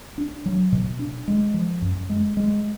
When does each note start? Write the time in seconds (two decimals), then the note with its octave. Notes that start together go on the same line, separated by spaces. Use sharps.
0.18 D4
0.46 F#3
0.72 B2
0.99 D4
1.28 G#3
1.54 F3
1.82 F#2
2.09 G#3
2.37 G#3